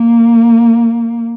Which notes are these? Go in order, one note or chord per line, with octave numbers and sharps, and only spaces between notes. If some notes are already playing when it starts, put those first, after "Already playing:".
Already playing: A#3